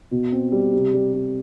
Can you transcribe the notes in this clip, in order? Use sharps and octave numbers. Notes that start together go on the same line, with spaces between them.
B2
C4
G3
C3
G3
G3